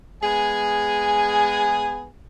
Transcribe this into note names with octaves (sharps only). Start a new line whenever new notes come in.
G#3 B3 G#4 G#5